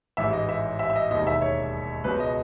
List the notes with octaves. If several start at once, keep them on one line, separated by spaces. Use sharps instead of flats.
A1 G#2 E3 E5
D#5
E5
E5
E5
D#5
E1 D#2 D#3 D#5
E5
C#5
C#2 B2 F#3 B4
D#5